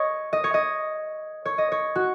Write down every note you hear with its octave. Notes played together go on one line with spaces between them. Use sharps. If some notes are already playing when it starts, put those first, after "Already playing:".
Already playing: C#5 D#5
D#5
C#5
D#5
C#5
D#5
C#5
F#4